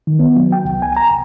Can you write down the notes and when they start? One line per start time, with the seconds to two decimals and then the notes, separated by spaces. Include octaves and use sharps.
0.07 D#3
0.19 B3
0.36 F#3
0.52 G5
0.65 C2
0.82 G#5
0.97 A#5
1.11 C2